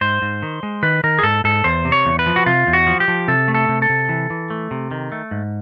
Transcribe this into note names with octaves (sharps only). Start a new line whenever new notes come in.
G#2 C5
G#2
D#3
G#3
D#3 B4
D#3 A#4
G#4
G#2 A4
G#2 A4
E2 C5
C3
C#5
E2
B4
F3
F#4
C3 F4
E2
F#4
F3
G4
F3
C3 A4
A3
A4
C3
A4
C3
E3
E3
A3
C3
D#3
A3
G#2